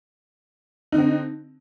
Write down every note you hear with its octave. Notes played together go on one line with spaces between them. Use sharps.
D3 C4 D#4